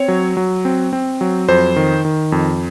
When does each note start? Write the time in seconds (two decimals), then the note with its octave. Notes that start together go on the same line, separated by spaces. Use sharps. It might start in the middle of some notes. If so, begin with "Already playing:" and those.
Already playing: C4 C#5
0.08 F#3
0.37 F#3
0.65 C4
0.93 C4
1.21 F#3
1.48 F2 C5
1.76 D#3
2.05 D#3
2.32 F2